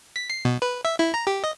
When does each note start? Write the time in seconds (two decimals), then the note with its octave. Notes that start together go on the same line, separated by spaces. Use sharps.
0.16 B6
0.30 C7
0.45 B2
0.62 B4
0.85 E5
0.99 E4
1.14 A#5
1.27 G4
1.44 D#5